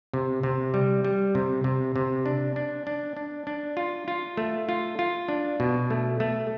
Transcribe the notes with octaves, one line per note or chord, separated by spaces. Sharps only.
C3
C3
G3
G3
C3
C3
C3
D4
D4
D4
D4
D4
F4
F4
A3
F4
F4
D4
B2
A3
A3